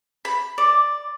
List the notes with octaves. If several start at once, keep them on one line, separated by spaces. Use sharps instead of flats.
B5
D5